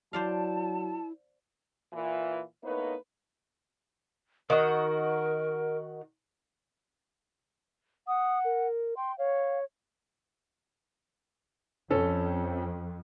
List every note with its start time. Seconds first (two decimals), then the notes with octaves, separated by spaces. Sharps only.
0.13 F#3 E4 C5 D5 F5 A5
1.92 A#2 E3 F4
2.63 A2 A#3 B3 D#4 B4 C#5
4.50 D#3 F#4 A#4 D#5
8.07 F#5 D#6
8.44 A#4
8.97 G5 C6
9.18 C#5 F5
11.90 F2 C#4 A4